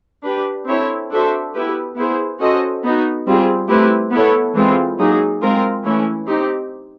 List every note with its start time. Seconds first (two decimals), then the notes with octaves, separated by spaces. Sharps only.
0.25 D4 G4 B4
0.67 C4 E4 A4 C#5 E5
1.11 D4 F#4 A4 C5 E5
1.54 B3 E4 G4 B4
1.97 B3 E4 G#4 C5
2.40 C#4 F#4 A4 C5 D#5
2.83 B3 D#4 F#4
3.26 G3 C4 F4 G#4
3.69 A3 C4 E4 G4 B4
4.12 B3 E4 A4 C#5
4.55 E3 G#3 C4 F4
4.99 F#3 A#3 D#4 G#4
5.41 G#3 C4 F4 A#4
5.84 E3 A3 C#4 E4
6.27 C4 D#4 G4